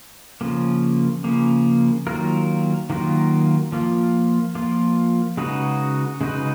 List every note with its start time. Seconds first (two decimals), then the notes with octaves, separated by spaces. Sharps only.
0.41 C#3 F3 A#3
1.24 C#3 F3 A#3
2.07 D#3 F#3 A#3 F4 A#4
2.90 D#3 F#3 A#3 F4 A#4
3.72 F3 A#3 F4
4.55 F3 A#3 F4
5.37 C#3 G#3 D#4 F#4 B4
6.21 C#3 G#3 D#4 F#4 B4